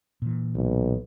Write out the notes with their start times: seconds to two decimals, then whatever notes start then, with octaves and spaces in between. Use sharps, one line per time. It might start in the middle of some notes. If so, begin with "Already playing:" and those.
0.22 A#2 E3
0.55 B1